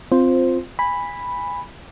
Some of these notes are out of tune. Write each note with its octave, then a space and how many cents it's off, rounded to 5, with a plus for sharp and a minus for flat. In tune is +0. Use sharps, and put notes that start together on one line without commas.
C4 -10 F4 +0 C5 +0
G#5 -20 B5 +0